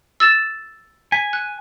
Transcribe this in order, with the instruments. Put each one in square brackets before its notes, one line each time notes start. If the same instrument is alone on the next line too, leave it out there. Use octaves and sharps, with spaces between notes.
[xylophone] E6 A6 E7
[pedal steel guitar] G#5 [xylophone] B6
[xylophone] F#6